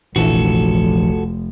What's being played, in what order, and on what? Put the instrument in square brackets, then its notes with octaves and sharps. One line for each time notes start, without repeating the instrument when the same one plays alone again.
[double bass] F1 [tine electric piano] A#1 [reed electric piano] E3 F3 [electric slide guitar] F#4 A4